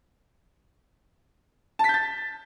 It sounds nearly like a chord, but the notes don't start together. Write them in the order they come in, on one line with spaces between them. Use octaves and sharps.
A5 B6 G6 A6